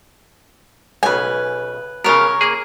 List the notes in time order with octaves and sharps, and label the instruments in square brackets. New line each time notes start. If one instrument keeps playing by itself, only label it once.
[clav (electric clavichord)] B1 C#3 [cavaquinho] B4 G#5
[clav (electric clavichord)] C#3 B3 [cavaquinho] A#4 C#5
[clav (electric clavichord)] A#3 G#4